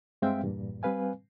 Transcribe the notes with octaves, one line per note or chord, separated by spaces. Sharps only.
G2 G#3 C4 E5 F5 G5
E2 G2 A#2
G3 C4 B4 F5 G#5